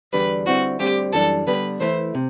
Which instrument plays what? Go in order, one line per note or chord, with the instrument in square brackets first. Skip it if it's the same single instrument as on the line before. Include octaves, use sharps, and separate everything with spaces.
[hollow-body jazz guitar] E2 D3 G3 D4 G4 [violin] B4
[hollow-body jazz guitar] D3 G3 C4 E4 [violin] F#4
[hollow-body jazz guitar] D2 D3 G3 C4 [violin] G4
[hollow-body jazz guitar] F#2 E3 G3 D4 [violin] A4
[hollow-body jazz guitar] D3 G3 B3 [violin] B4
[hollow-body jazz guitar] E3 A3 E4 B4 [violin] C5
[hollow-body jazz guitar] C3